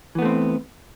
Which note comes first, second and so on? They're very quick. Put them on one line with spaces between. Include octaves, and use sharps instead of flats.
E3 B3 A3 C4